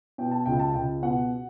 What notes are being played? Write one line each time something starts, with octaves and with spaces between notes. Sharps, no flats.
B2 G5
A5
C#2 G5
A5
C#2 G5
B2 F#5